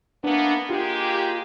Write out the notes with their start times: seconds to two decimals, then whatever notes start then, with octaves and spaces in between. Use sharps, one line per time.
0.24 E3 A#3 B3 D4
0.70 G#3 A#3 F4 G4